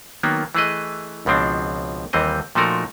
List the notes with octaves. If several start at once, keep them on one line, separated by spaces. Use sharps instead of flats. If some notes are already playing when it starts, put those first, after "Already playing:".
D#3 F#3 A#3 B3
E3 A3 G#4 B4 D#5
C#2 B2 F3 C4 D4
D#2 E3 G3 C4 D#5
A#2 F3 A3 D#4 F#4 A#4